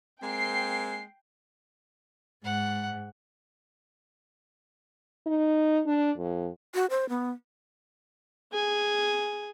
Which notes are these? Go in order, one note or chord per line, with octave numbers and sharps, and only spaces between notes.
G#3 A#3 C4 G5 C7
G#2 F#5
D#4
D4
F2
F#4
C5
B3
G#4 G#5